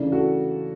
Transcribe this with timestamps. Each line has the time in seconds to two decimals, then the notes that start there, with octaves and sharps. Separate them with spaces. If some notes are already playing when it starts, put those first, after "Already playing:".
Already playing: C#3 E3 A3 D4
0.12 F#4 A4